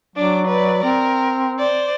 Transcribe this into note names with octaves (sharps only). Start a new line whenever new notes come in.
F#3 D4 D6
B4 D5
C4 A#4
C5 D5